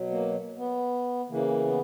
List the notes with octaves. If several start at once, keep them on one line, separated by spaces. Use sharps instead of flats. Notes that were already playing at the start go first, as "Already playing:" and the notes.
Already playing: B2 F#3
A#3
B3
C#3 E3 A#3
B3